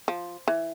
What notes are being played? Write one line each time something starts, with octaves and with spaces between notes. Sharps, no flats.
F3
E3